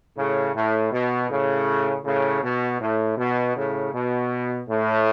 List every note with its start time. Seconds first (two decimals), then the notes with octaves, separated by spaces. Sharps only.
0.16 A2 C#3
0.54 A2
0.91 B2
1.29 A2 C#3
2.04 A2 C#3
2.43 B2
2.81 A2
3.17 B2
3.55 A2 C#3
3.93 B2
4.68 A2